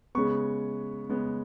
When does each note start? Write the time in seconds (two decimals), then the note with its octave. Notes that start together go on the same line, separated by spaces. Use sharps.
0.15 C#3 G#3 B3 C#6
1.09 C#3 G#3 B3